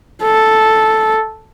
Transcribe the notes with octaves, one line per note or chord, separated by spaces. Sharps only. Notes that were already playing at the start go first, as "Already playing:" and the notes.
A4